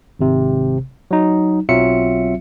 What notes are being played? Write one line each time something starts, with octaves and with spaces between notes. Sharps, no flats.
G#1 C3
F#3 D#4
B1 F#3 C4 F4 E5 C#7